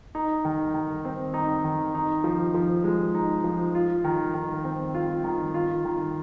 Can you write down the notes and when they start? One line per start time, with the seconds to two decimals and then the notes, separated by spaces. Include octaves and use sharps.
0.15 D#4
0.45 D#3
0.74 D#3
1.05 C4
1.34 D#4
1.64 D#3
1.95 D#4
2.24 F3
2.54 F3
2.84 G#3
3.15 D#4
3.44 F3
3.75 F4
4.04 D#3
4.34 D#3
4.64 C4
4.95 F4
5.24 D#3
5.54 F4
5.85 D#3